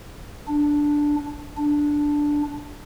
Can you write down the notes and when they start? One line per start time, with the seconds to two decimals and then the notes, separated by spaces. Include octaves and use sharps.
0.48 D4
1.57 D4